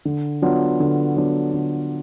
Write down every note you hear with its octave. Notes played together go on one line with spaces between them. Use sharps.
D3
F#3 B3 D4 F4
D3
F#3 B3 D4 F4
D3